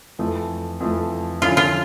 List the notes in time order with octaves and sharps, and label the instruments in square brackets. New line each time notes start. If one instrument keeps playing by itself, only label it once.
[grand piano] F2 E3 A3
F2 E3 A3
[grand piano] D3 F3 C#4 E4 [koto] F4
[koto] F4